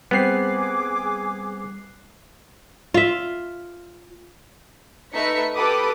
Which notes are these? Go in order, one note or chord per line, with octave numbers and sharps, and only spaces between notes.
G3 B3 C4 G#4 D6 F#6 C7
F4 E5
A3 D#4 B4 E5 B6 C#7
G4 A4 B4 B5 D6 D#6